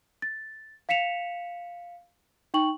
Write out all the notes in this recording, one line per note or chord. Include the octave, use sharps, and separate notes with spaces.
A6
F5 B6 C#7 E7 F7
D#4 G5 C#6 F#7